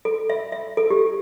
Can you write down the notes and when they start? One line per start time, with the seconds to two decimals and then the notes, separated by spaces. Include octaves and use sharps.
0.05 A4
0.30 E5
0.52 E5
0.77 A4
0.90 G4